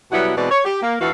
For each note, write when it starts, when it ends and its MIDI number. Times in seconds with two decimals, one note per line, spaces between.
0.11 0.32 47
0.11 0.32 54
0.11 0.32 55
0.11 0.32 59
0.11 0.32 64
0.11 0.32 66
0.35 0.47 47
0.35 0.47 52
0.35 0.47 56
0.35 0.47 60
0.35 0.47 71
0.35 0.47 74
0.50 0.62 73
0.65 0.78 67
0.82 0.95 58
0.99 1.10 38
0.99 1.10 52
0.99 1.10 66
0.99 1.10 69
0.99 1.10 77